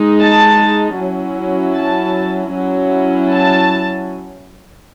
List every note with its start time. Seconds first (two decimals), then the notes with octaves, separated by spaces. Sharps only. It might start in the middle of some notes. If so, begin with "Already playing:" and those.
Already playing: G#3 D#4
0.21 A5
0.98 F#3 C#4 E4
1.76 A5
2.55 F#3 C#4 E4
3.33 A5